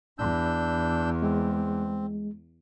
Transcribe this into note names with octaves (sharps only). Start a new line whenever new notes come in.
E2 D4 E6 G6
G#3 C4